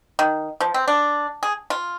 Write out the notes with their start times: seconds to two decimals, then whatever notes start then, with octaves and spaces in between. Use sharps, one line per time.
0.19 D#3
0.60 F3
0.74 C4
0.88 D4
1.43 G#4
1.70 F4